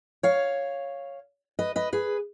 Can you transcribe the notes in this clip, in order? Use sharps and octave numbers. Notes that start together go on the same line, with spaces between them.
C#5 F5
B4 D#5
B4 D#5
G#4 B4